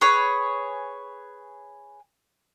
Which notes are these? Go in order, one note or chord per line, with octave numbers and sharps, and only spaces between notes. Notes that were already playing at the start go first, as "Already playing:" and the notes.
G#4 B4 C#5